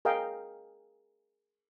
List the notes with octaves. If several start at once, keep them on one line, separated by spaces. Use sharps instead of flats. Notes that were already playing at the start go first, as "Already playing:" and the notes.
G#4 A#4 D#5 F5 G5